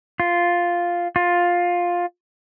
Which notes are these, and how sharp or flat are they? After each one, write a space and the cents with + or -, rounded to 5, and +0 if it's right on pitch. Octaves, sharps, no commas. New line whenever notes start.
F4 +0
F4 +10